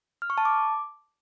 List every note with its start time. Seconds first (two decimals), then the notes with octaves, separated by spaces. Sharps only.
0.22 F6
0.30 C#6
0.38 A5
0.45 D6